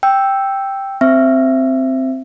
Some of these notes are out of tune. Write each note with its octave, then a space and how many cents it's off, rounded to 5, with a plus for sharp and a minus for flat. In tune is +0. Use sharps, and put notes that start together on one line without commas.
G5 +0 E6 +0
C4 +0 E5 +20